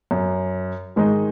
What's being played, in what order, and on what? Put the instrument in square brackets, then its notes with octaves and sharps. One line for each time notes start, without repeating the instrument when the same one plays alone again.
[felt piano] F#2
[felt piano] G#2 [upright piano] D#3 G#3 D#4